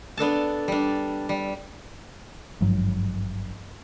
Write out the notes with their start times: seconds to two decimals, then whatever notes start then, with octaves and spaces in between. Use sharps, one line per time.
0.17 B3 D4 A4 A5
0.68 G3 D4
1.29 G3
2.61 G#1 G2 F3 F#3